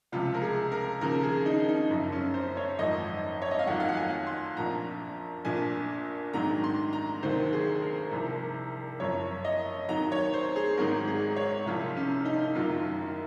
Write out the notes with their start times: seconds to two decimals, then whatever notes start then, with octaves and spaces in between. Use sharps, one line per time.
0.12 C#2 C3 F3 F4
0.34 A#4
0.42 G#4
0.72 A#4
1.01 D#2 C#3 F3 A#4
1.23 G#4
1.46 D#4
1.68 D#4
1.90 F#1 F#2 F3
2.12 C#4
2.34 C5
2.57 C#5
2.79 G#1 F#2 F3 D#5
3.42 C#5
3.51 D#5
3.59 F5
3.67 F2 D#3 F#3 F#5
3.80 F5
3.89 F#5
3.97 G#5
4.27 C6
4.57 A#1 A#2 F3 A#5
5.45 A#1 A#2 F3 G#5
6.33 A#1 G#2 D#3 F#3 A#5
6.64 C6
6.93 A#5
7.23 F1 D#2 D#3 F#3 C5
7.52 G#4
7.82 A#4
8.11 C2 C3 F3
9.00 F#1 F#2 F3 C#5
9.45 D#5
9.88 D#2 D#3 F#3 A#5
10.12 C#5
10.34 C5
10.56 G#4
10.78 G#1 G#2 F#3 A#4
11.07 G#4
11.36 C#5
11.66 C2 C3 F3 F4
11.97 C#4
12.25 D#4
12.55 F#1 F#2 D#3 F#3 F4